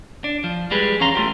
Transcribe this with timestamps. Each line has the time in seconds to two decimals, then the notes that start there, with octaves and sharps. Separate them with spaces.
0.24 D4
0.44 F3
0.71 G3 G#3 G4 G#4 B4
1.00 E2 C#4 F5 A#5 C6
1.15 A3 F4 G4